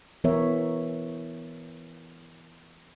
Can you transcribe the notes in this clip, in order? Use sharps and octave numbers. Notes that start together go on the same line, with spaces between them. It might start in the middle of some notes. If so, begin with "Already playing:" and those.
E3 B3 A#4 C#5 E5